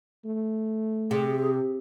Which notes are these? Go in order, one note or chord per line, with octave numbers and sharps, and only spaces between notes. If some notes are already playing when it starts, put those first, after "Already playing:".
A3
C3 G#4